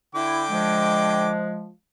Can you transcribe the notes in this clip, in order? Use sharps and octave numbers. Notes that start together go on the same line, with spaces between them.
D3 E4 G5 D6
F3 G#3